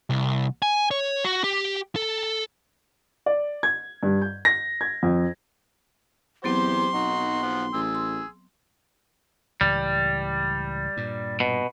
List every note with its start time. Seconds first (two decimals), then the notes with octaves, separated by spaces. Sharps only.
0.10 C2
0.62 G#5
0.91 C#5
1.24 F#4
1.44 G4
1.96 A4
3.26 D5
3.63 G#6
4.03 G2
4.22 G6
4.45 A#6
4.81 G#6
5.03 F2
6.44 E2 F#3 B3 C4 G4 C5 C6
6.94 B1 D#4 F#4
7.43 F3 F#5
7.74 A1 G#4 E6
7.95 C6
9.61 C#2 A2 E3 G3
10.97 G2 A#2
11.40 B2